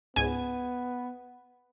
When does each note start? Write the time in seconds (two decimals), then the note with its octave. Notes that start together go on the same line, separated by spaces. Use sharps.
0.16 C#2 G#2 B3 G#5